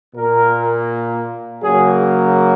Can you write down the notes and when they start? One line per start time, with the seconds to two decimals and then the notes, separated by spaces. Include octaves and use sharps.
0.14 A#2 A#3 A#4
1.63 C#3 F#3 A#3 G#4